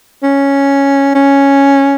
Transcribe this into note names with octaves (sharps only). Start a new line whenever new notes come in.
C#4
C#4